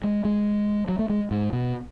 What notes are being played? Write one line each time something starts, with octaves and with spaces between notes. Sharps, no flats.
G#3
G#3
F#3
A3
G#3
G#2
B2